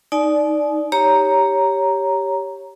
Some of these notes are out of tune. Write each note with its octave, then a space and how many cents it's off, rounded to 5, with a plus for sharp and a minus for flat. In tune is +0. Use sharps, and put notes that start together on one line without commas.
D#4 +0 D5 +0 G#5 +45
G4 +0 C#5 +0 A#5 +0